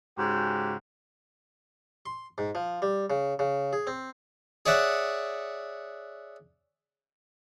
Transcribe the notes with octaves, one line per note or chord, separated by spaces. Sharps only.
G#2 C#3 F#4 G4
C6
G#2
F3
G3
C#3
C#3
G#4
C4
G#4 C#5 D5 E5 F#5